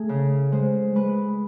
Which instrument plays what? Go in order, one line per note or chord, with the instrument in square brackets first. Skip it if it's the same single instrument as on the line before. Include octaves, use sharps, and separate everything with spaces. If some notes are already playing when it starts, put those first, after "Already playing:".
Already playing: [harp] A3 G#4
C#3
G#3 C5
G#3 B4